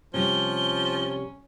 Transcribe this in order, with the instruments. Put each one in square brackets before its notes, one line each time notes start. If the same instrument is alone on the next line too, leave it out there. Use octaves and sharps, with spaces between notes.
[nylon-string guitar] C3 G3 [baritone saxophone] F3 [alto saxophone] C#4 [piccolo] G7